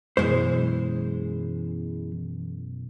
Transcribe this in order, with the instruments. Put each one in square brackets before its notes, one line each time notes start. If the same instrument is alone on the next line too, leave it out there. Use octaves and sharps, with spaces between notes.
[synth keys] F#2 B2 [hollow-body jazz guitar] E3 G#3 C5